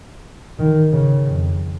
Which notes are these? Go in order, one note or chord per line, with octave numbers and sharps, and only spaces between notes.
D#3
C#3
F2